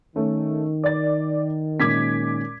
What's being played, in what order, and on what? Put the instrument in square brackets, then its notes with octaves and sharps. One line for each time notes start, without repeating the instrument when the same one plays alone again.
[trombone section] D#3 [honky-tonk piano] A3 C#4
[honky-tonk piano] D5 A6
[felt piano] A#2 G#3 C#4 [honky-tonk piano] D6 G#6 B6